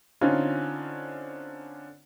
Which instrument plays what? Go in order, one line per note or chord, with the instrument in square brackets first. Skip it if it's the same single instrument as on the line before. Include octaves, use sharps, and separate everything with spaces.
[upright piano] D3 C4 C#4 D#4 F4